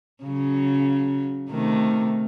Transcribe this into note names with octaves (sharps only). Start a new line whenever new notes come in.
C#3 F#3
C3 D#3 A3